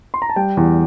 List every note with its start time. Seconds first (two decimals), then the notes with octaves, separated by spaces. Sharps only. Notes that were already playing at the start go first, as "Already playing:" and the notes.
0.14 C6
0.22 A#5
0.30 A5
0.36 G3 G5
0.57 E2